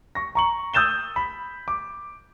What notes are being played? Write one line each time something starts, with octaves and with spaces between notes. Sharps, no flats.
C#6 A#6
A#5 C#6 F#7
D#6 E6 G6 A6 E7 G7
B5
D6